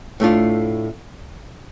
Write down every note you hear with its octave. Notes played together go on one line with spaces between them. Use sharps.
A2 A3 D4 F4